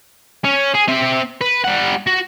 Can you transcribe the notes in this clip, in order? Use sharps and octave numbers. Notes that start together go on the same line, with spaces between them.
C#4
G#4
C4 E5
B4
G3 F#5
F#4